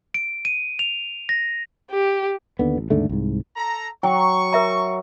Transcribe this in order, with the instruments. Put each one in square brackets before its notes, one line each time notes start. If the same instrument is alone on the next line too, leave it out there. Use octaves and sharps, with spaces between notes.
[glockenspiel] D7
D#7
F7
A#6
[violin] G4
[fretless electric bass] D#2 D3 B3
A1
D#2 G#2 D3 A3
C2 G#2
[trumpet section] A4 A#5
[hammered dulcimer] F#3 [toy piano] G5 [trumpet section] C#6
[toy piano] A#4 E5 A#5